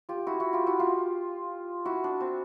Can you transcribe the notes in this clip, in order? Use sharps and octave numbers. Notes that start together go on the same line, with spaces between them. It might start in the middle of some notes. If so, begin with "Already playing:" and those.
F4 G4
E4 F#4
E4 F#4
F4 G4
E4 F#4
F4 G4
E4 F#4
D4
C4